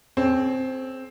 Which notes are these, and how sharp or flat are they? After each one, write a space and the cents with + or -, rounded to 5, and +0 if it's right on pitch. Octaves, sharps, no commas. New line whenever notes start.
C4 +0 G#4 +40 C#5 -5